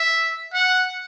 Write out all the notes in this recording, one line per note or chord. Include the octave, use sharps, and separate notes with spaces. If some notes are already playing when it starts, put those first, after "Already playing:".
Already playing: E5
F#5